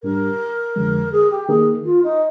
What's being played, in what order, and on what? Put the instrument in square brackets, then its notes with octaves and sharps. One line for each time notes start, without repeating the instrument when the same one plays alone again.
[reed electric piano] G#2 G3 D4 G4 [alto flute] A#4
[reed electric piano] F2 D3 F3 G#3
[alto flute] G#4
G4
[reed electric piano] D#3 A#3 D#4 A#4 [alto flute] G#4
[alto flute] F4
D#4